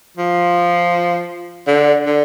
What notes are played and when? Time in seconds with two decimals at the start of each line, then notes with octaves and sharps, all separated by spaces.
0.17 F3
1.67 D3
2.06 D3